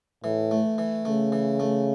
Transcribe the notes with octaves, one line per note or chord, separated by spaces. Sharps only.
A2 E3
A3
E3
C#3 A3
E3
A3